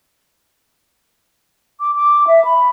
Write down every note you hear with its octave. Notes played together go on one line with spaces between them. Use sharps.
D6
D6
E5
B5